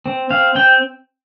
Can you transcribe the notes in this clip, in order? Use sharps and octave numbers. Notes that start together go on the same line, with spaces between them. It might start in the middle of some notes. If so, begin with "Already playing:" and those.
C4
C4 F5
C4 G5